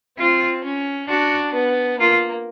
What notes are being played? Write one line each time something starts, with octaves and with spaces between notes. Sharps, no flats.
C4 F4
C#4
D4 F#4
B3
A#3 F4